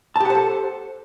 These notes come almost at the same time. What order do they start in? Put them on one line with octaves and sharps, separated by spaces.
A5 G4 F#5 C5 A4